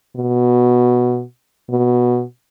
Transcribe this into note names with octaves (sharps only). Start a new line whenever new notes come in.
B2
B2